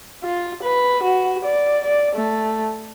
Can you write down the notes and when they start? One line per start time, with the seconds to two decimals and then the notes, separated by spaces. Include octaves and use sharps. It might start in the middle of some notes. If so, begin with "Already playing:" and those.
0.24 F4
0.63 B4
1.03 F#4
1.45 D5
1.85 D5
2.16 A3